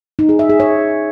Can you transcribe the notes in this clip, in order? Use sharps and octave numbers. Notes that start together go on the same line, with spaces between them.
D#4
G#4
E5
G#4
C#5